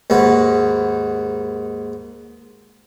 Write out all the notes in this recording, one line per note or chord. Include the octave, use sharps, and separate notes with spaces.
D#2 G#2 F#4 B4